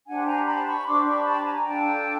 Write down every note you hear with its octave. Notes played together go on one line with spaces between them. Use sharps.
D4 G4 C5 F#5 G#5
G#5 A#5
A5 B5
B5 C#6
D4 G4 C5 C6 D6
B5 C#6
A5 B5
G#5 A#5
D4 F4 A4 G5 A5